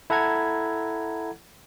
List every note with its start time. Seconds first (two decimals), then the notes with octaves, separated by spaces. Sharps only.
0.10 E4 A4 F#5 A#5 G#6